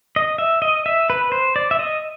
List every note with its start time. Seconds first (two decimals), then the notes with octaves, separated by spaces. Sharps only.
0.16 D#5
0.38 E5
0.62 D#5
0.86 E5
1.10 B4
1.32 C5
1.56 D5
1.71 E5
1.79 D#5